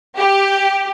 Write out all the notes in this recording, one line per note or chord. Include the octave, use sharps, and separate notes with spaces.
G4